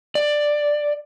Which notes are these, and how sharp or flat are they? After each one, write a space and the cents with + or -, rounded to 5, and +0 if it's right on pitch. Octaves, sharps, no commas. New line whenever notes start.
D5 +10